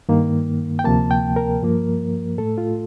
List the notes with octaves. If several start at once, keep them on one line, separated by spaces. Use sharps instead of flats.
G2 D#3 A#3
G5
D2 C3 F3 A#3 A5
G5
A#4
G2 F3 A#3
A2 A3 A4
F4